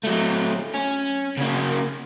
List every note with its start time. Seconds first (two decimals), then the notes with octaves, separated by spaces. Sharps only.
0.03 F#3 A3
0.74 C#4
1.38 C#3 A#3